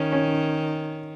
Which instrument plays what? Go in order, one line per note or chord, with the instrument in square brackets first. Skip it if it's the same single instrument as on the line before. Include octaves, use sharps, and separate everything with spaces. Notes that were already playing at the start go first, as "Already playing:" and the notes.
Already playing: [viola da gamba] D#3 [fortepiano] C#4
[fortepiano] C#4